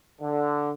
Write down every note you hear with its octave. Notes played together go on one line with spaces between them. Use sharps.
D3